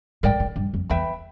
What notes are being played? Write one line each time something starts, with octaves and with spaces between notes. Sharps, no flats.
G#2 A#4 D5 G5
G#2
G2
F2
E2 B4 E5 G5 B5